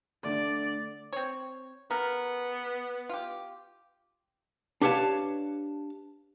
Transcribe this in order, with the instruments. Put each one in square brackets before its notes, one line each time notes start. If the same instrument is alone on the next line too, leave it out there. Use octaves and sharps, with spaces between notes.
[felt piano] D3 A3 [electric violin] D5
[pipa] C4 C#5
[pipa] C#3 A#4 [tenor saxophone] B3
[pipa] F4 G4
[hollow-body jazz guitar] D4 G4 B4 C#5 F5 A5